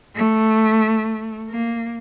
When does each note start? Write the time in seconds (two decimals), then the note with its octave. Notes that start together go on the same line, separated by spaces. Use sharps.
0.16 A3
1.49 A#3